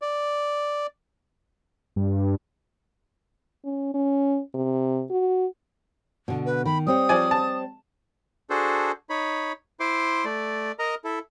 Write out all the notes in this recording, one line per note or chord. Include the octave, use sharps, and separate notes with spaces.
D5
G2
C#4
C#4
C3
F#4
B2 D3
B4
D#3 B5
G3 C4 C#5 D#6
F3 D5 G#5
A5
D4 F#4 G#4 A4 C5
D#4 C#5 B5
E4 C5 C6 D6
A3 D5
A#4 D#5 A#5
E4 A4